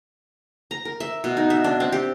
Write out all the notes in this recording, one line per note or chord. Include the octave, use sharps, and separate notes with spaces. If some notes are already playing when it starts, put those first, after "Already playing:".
A#5
A#4
E5
B2
D#4
E5
D4
C4
G4